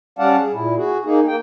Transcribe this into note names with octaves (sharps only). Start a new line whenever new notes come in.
G3 C#4 D5 F5 F#5 A5
G#4
A#2 E4
F#4 G#4
A#3 D#4 G#4
A#3 G5